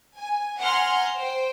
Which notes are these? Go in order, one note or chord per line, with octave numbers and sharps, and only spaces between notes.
G#5
F#5 G#5 A#5 C6 F6
C5 G5